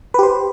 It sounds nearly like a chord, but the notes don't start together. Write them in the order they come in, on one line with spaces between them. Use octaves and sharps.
B4 G4 C5